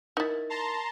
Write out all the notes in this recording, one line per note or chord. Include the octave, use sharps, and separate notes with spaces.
D#4 E4 A#4 A6
A5 A#5 C6